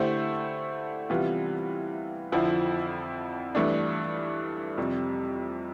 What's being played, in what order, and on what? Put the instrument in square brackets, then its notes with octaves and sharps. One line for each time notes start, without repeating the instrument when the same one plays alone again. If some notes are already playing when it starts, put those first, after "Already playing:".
Already playing: [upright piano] D3 A3 E4 G4 C5
C3 E3 G3 B3 F4
F2 D3 F3 C4 E4
G2 E3 A3 D4
F2 C3 G3